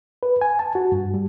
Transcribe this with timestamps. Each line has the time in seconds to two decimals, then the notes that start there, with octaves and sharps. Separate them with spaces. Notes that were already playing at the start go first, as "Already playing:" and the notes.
0.23 B4
0.41 G#5
0.59 A5
0.75 F#4
0.92 G2
1.14 G3